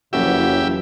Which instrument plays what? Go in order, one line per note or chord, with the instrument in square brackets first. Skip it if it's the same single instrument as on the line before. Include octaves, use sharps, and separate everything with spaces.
[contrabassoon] F#1 [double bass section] F2 E3 F#3 [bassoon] F#4 [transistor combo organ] G4 E5